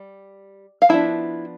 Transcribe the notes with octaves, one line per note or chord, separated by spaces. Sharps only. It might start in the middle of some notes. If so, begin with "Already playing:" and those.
Already playing: G3
F5
F3 B3 D4 E4 E5